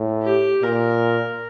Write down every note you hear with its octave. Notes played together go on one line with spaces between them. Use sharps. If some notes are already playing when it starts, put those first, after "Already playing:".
Already playing: A2
G4
A#2 A#4